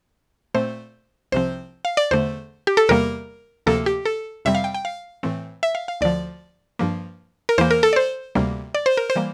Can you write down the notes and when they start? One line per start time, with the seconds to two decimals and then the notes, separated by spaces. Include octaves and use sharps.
0.54 A#2 A3 C4 C5
1.32 C2 C3 F3 C4 C5
1.85 F5
1.97 D5
2.11 E2 D3 A3 C5
2.67 G4
2.77 A4
2.89 E2 C3 G3 A#3 A#4
3.66 D2 C3 F3 A#3 A4
3.86 G4
4.05 A4
4.45 F2 C3 G3 C4 E5
4.55 F5
4.64 G5
4.74 G5
4.85 F5
5.23 A2 E3 A3 C4
5.63 E5
5.75 F5
5.88 F5
6.01 D2 D3 F3 D5
6.79 G2 F3 A#3
7.49 A#4
7.58 E2 E3 A#3 C5
7.71 A#4
7.83 A4
7.93 D5
7.96 C5
8.35 D2 C3 G3 A#3
8.75 D5
8.86 C5
8.97 A#4
9.10 C5
9.16 E3 G3 A#3